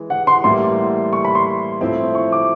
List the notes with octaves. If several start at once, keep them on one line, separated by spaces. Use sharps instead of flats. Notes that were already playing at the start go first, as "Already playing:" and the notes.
Already playing: E3 G#3
F#5
C6
A2 E3 G3 A#3 C6
C#6
B5
C6
A2 F3 A3 C4 E4
C#6
D6